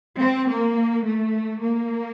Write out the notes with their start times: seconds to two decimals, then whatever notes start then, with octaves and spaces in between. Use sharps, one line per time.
0.23 C4
0.51 A#3
1.07 A3
1.64 A#3